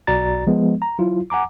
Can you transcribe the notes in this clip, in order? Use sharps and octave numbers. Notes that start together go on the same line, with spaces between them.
B1 F#4 D5 A#5 A6
F3 G#3 B3
A#5
F#3 E4 F4
F#5 G#5 A#5 D6